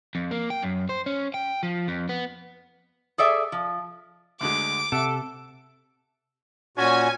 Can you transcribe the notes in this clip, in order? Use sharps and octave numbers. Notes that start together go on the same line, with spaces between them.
F2
A#3
G5
F#2
C5
C#4
G5
F3
F2
B3
G#4 A4 D5 E5 G#5
F3
D2 D3 G#3 D6
C3 A4 E5 F#5
A#2 C#4 F#4 G#5